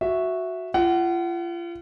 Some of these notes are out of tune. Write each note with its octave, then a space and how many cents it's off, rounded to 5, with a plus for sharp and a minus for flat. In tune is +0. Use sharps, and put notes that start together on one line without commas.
F#4 -5 E5 +0
F4 -35 F#5 +25